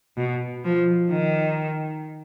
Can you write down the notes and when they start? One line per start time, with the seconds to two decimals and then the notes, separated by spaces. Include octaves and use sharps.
0.17 B2
0.65 F3
1.11 D#3